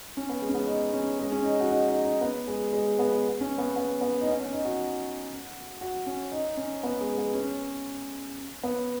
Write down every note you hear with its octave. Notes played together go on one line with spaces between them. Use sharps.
C#4
B3
G#3
C#4
B3
D#4
C#4
G#3
C#4
D#4
F#4
D#4
D#4
D#4
B3
G#3
G#3
B3
C#4
B3
B3
B3
D#4
C#4
C#4
D#4
F#4
F#4
C#4
D#4
C#4
B3
G#3
B3
C#4
B3